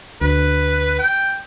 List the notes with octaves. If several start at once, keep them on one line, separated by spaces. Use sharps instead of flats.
D2 B4
G5